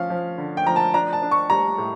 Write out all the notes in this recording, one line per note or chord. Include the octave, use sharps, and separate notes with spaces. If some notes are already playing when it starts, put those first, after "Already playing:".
Already playing: F3 C#4 F5
F3
D3
G5
F3 A#5
A5
D4 A#5
A5
D4
C#6
G3 A#5
A2